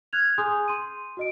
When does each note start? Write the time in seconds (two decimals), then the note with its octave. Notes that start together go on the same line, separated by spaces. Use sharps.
0.13 F6 F#6 G#6 F7
0.38 G#4 G#5 C6 D#6 G6
0.68 C6 D#7
1.17 F#4 D#5 D7